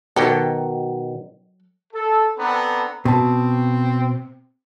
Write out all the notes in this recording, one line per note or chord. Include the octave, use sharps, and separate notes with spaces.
B2 D#3 F#3 G4 A4
A4
B3 C4 D4 A4 B4 A#5
B2 C4 A5